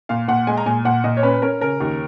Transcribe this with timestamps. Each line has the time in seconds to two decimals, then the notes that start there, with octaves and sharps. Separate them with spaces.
0.09 A#2 F5
0.28 A#2 F#5
0.47 G#3 G#5
0.57 A#5
0.66 A#2 G#5
0.85 A#2 F#5
1.04 A#2 D#5
1.17 C#5
1.23 C#4 B4
1.42 C#4 A#4
1.61 C#3 A#4
1.80 D#2